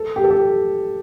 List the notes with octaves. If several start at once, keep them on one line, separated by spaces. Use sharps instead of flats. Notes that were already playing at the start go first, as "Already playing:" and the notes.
Already playing: A4
G4
A4
G4